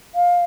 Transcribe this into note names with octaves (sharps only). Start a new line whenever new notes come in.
F5